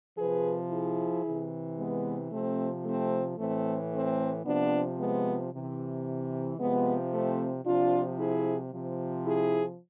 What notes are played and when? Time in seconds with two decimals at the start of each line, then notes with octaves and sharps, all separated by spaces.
0.18 C3 F3 G#4 B4
0.71 E4 G#4
1.25 C3 E3
1.78 G#3 B3
2.32 C3 F3 A3 C4
2.85 A3 C4
3.38 A2 E3 A3 C4
3.92 A3 C4
4.44 C3 F3 B3 D4
4.99 G#3 B3
5.52 C3 E3
6.58 C3 F3 G#3 B3
7.11 A3 C4
7.65 C3 F3 D4 F4
8.18 E4 G#4
8.72 C3 F3
9.25 E4 G#4